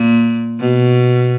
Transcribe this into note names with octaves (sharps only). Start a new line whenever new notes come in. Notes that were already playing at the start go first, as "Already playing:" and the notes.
Already playing: A#2
B2